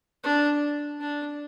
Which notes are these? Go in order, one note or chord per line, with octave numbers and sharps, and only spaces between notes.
D4
D4